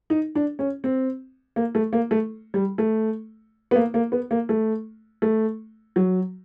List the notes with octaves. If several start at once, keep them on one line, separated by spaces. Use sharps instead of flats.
D#4
D4
C#4
C4
A#3
A3
A#3
A3
G3
A3
B3
A#3
A#3
B3
A#3
A3
A3
F#3